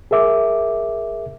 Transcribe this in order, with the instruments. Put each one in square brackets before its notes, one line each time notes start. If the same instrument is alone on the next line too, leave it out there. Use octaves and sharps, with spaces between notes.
[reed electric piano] G#4 A#4 E5 D6